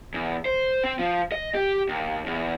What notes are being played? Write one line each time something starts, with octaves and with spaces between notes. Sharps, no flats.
E2
C5
C4
F3
D#5
G4
D#2
E2